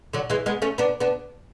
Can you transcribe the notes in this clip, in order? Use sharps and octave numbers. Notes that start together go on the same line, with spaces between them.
D3 F#3
E3 G#3
G#3 B3
A3 C#4
B3 D4
B3 D4